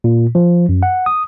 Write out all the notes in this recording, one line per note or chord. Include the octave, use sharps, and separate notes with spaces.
A#2
F3
F#2
F#5
D#6